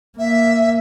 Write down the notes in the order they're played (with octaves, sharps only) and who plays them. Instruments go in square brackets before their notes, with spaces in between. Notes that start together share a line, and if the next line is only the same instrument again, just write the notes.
[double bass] A#3 [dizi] E5